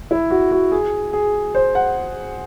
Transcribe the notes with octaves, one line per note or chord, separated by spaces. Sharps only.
E4
F#4
F#4
G#4
G#4
C5
F#5